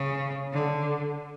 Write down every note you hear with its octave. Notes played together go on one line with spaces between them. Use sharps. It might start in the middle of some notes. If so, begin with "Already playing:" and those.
Already playing: C#3
D3